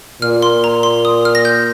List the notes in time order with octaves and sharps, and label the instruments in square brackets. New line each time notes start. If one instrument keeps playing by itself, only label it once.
[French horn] A#2 [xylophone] F6
[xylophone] C6
A#5
C6
D#6
F6
A#6
G6